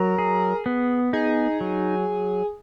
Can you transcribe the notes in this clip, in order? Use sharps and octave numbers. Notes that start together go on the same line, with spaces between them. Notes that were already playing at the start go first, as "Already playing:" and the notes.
Already playing: F#3 A#4
G#4
B3
D#4 G#4
F#3